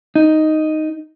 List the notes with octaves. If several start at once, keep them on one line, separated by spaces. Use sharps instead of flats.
D#4